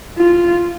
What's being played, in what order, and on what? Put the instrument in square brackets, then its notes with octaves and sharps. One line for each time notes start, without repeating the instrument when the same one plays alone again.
[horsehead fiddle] F4